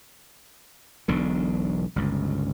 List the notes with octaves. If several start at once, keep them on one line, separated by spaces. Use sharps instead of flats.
E1 B1 D3
G1 C#2